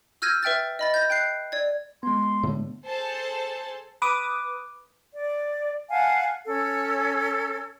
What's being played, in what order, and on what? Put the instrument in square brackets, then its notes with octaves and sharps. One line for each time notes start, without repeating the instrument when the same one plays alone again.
[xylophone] E6 F6 G6 G#6 A#6 D#7
B4 E5 G5 F6 A6
D#5 B5 A6
G6 A#6
G5 F#6 C7
D5 G#6
[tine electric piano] G#3 B3 [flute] C6
[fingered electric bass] A2 D3 A3
[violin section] G#4 A4 C5 A5
[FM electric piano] B4 D6 D#6
[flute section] D5
F5 F#5 G#5 A5
C#4 A4